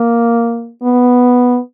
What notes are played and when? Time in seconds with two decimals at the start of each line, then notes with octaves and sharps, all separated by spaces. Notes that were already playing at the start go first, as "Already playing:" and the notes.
Already playing: A#3
0.82 B3